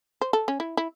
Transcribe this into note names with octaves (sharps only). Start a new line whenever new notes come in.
C5
A4
C#4
E4
E4